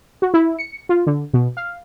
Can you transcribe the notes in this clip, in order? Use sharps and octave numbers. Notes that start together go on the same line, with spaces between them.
F#4
E4
C#7
F4
D3
B2
F5